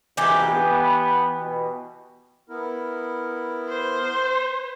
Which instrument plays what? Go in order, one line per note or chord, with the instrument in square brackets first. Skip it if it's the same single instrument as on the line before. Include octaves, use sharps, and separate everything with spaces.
[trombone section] A#1 G#2 B2 [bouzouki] E3 G4
[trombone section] B3
B2
[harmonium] B3 E4 A#4
[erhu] C5